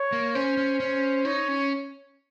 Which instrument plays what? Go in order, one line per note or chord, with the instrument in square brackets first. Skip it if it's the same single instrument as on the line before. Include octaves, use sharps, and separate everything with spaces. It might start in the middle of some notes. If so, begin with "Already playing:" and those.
Already playing: [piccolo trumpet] C#5
[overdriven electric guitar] A#3
[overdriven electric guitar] C#4 [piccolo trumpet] C5
[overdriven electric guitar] C#4
C#4
[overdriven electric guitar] D#4 [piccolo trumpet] C#5
[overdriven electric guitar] C#4